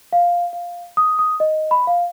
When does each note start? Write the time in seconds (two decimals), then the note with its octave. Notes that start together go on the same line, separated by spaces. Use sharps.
0.13 F5
0.53 F5
0.97 D#6
1.19 D#6
1.40 D#5
1.71 B5
1.87 F5